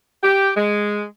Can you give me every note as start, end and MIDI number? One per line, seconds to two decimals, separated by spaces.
0.22 0.50 67
0.55 1.03 56